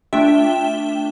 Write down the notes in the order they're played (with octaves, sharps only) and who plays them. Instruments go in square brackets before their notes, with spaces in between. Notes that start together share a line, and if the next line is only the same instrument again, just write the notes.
[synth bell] A3 D4 F4 E5 G5